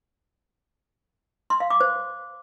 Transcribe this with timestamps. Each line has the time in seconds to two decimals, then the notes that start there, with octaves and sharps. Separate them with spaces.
1.50 C6
1.60 F5
1.70 D6
1.81 C5